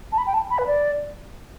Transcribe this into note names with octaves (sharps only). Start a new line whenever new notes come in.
A5
B5
G5
A5
B5
B4
D5